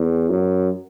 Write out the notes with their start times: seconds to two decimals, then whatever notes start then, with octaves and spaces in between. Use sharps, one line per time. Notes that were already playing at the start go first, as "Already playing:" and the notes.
Already playing: E2
0.30 F#2